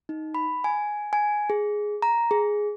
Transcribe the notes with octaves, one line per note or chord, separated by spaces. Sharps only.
D#4
B5
G#5
G#5
G#4
A#5
G#4